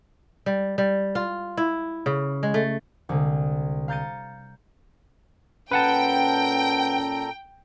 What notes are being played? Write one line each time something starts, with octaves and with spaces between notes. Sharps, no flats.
G3
G3
F4
E4
C#3
G#3
A3
C2 D3 G#3
F5 A#5 G6 A6 C#7 D#7
A#2 C#4 A4 B4 F#5 G5 A5 A#5